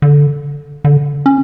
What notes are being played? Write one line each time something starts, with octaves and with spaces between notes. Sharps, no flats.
D3
D3
C#4